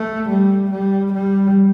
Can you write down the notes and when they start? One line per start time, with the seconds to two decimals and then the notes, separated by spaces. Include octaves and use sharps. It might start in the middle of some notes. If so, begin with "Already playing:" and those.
Already playing: A3
0.29 G3
0.71 G3
1.13 G3